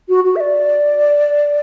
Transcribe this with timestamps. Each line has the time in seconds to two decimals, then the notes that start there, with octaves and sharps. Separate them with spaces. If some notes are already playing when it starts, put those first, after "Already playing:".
0.09 F#4
0.24 F#4
0.36 E5
0.40 D5